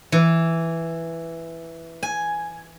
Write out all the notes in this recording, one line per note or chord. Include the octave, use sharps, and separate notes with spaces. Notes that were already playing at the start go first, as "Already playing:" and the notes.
E3
G#5